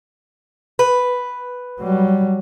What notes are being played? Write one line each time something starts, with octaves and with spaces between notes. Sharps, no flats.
B4
F#3 G3